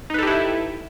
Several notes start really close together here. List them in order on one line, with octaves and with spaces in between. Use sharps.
D#4 B4 A4 G4 E4